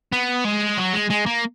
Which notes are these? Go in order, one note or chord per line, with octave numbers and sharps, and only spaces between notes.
B3
G#3
F#3
G#3
G#3
A#3